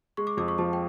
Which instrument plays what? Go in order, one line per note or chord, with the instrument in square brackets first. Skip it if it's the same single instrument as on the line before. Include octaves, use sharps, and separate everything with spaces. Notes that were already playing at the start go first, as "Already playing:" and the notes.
[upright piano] G#3 [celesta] C#6
[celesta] D6
[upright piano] F2 [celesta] D6
[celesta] C#6
[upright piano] F3 [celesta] A5
[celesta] G5